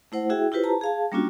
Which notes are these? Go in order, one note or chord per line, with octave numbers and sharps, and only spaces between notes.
A3 E4 C5 F#5
E4 F#4 G#4 E5 G5
E4 F4 G4 B4 C5
A5 A#5
G#4 F5 A5
G3 A#3 C#4 D4 F4 F#4